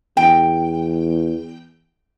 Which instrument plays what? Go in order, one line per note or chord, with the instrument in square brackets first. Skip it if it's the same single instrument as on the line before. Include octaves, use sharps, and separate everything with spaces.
[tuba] E2 [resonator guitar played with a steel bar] G5